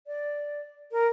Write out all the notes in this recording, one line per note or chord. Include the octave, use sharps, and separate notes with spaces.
D5
A#4